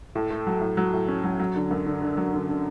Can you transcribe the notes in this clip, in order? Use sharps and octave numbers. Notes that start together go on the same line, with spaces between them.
A2
A3
F#3
A2
F#3
A2
C#4
F#3
F#3
D3
F#2
D3
D3
F#3
D3
D3